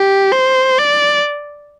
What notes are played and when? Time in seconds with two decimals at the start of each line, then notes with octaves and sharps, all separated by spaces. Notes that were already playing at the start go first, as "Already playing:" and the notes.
Already playing: G4
0.33 C5
0.78 D5